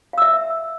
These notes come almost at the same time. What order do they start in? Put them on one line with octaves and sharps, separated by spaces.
F5 E6 E5